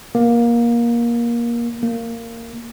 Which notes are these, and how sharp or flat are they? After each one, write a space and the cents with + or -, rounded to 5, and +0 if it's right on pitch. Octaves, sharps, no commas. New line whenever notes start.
A#3 +20
A#3 -15